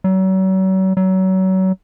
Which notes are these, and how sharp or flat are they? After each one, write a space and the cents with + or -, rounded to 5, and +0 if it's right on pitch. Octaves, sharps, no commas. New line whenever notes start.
F#3 +40
F#3 +30